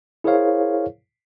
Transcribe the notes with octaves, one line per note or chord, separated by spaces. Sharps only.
E4 G#4 A#4 C5 C#5 F5